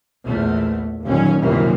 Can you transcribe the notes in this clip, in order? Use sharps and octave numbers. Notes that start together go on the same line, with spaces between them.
A#1 E2 A3
G1 D#2 A#2 D#3 F#3 C#4
C2 F#2 A#2 D#3 E3 A#3